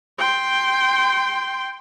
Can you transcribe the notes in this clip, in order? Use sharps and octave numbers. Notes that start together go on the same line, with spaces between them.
G5 C6